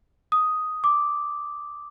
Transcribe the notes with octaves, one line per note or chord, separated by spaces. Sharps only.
D#6
D6